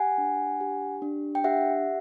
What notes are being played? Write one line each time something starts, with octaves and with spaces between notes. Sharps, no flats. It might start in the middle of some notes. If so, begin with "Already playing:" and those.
Already playing: G4 F#5 G#5
D4
G4
D4
G5
G4 E5 F#5